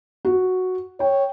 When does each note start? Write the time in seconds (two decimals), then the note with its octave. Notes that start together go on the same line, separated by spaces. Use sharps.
0.25 F#4
1.00 C#5 G5